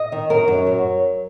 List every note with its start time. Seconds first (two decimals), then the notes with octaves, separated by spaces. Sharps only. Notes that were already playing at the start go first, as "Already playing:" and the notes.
Already playing: D#5
0.12 D#3
0.30 F#2 A#4
0.48 F#2
0.67 F#3